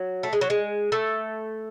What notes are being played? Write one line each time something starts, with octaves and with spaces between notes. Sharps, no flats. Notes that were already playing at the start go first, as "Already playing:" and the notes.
Already playing: F#3
A3
G#3
F#3
G#3
A3